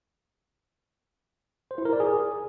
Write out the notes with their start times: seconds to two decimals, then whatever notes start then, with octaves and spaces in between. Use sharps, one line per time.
1.71 C5
1.78 E4
1.85 A#4
1.93 D5
2.00 G#4